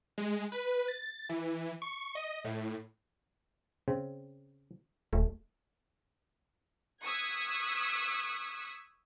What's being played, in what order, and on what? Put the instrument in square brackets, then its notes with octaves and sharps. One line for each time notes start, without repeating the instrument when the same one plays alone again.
[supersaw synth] G#3
B4
A6
E3
C#6
D#5
A2
[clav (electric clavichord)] C#3 C4
[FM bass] D#1 [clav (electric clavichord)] A3
[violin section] C#6 D#6 E6 F#6 G#6 B6